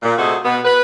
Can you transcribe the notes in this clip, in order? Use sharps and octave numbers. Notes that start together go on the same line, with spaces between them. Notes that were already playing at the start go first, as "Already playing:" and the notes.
A#2
C3 A3 F#4 G#4 A4 D#5
B2 B3
B4